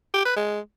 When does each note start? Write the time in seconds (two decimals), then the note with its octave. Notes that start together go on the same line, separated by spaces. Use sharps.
0.14 G4
0.25 B4
0.37 G#3